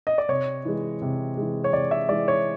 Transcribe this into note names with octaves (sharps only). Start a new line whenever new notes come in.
D#5
D5
C3 C#5
E3 G#3
C3
E3 G#3
C#5
C3 D5
E5
E3 G#3 D5
C#5